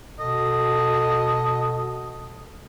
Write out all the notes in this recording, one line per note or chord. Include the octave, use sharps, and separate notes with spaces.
B2 F#4 A4 D#5